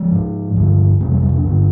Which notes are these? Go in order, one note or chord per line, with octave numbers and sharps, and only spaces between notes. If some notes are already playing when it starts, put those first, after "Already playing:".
Already playing: F3 G#3
G#2
G2 D3
F2 C3 G#3 C4
G3 A#3
G3 A#3
A#3 D4
G2 D3